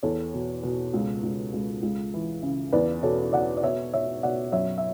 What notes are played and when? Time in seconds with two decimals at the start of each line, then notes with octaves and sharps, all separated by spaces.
0.03 E2 A4 C#5
0.34 B2
0.63 B2
0.93 C#2
1.23 C#2
1.53 C#2
1.83 C#2
2.14 E3
2.42 C#3
2.72 E2 B4 D5
3.02 B2 A4 C#5
3.33 B2 D5 F#5
3.57 D5
3.63 B2 C#5 E5
3.93 B2 C#5 E5
4.23 B2 D5 F#5
4.52 F#2 C#5 E5
4.78 E5